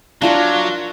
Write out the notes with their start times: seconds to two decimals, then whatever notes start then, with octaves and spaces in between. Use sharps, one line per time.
0.22 F#3 D4 F4 A#4 F5